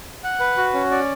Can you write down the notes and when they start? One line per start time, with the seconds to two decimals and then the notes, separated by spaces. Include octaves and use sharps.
0.24 F#5
0.40 B4
0.57 F#4
0.74 C#4
0.91 D5